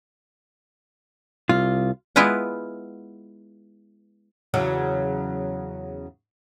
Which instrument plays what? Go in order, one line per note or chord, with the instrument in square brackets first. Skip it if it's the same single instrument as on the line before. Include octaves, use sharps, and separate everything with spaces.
[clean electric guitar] C2 [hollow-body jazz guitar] F4
[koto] G#3 B3 E4 F4 B4 F#5
[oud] E2 C#3 F#3